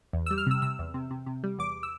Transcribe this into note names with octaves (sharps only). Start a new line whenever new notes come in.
E2
G3 E6
F6
C3 E6
C3 E6
E2
C3
C3
C3
G3
E2 D6
E6